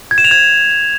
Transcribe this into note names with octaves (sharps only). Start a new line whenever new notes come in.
G#6
E7
F7
G#6